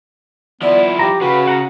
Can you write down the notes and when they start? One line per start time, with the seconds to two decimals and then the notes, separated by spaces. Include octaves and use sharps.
0.62 F3 B3 E4 D5
0.99 G4 F5 A#5
1.21 C#3 F#4 B4
1.47 F#5 A#5